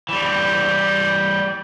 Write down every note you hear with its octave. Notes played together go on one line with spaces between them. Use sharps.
E3 G3